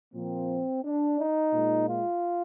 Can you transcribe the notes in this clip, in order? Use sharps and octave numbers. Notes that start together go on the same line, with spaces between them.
A#2 F3 A#3 C4
D4
D#4
A#2 G#3
F4